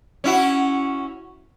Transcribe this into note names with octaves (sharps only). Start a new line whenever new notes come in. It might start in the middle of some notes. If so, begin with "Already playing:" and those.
C#4 E4 F#4